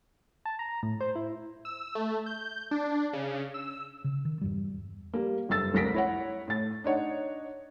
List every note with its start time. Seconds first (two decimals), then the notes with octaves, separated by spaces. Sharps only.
0.45 A5
0.59 A#5
0.83 A2
1.01 C5
1.16 E4
1.65 E6
1.95 A3
2.26 G6
2.71 D4
3.13 C#3
3.54 E6
4.04 C#3
4.25 D#3
4.41 E2 G2 G3
5.14 G3 A#3
5.49 F#1 G2 A4 E6 A6
5.74 F1 C2 A#4 A#6 B6 D7
5.94 E4 C#5 F#5
6.48 A2 A6
6.84 D4 D#4 C#5 F#5